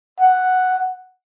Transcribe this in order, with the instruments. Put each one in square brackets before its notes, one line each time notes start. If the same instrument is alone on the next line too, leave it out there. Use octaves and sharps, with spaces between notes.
[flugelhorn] F#5